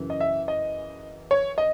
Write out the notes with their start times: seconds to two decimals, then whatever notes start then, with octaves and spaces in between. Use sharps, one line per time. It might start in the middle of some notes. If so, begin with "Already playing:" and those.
Already playing: F#2 C#3 E3
0.10 D#5
0.20 E5
0.48 D#5
1.31 C#5
1.58 D#5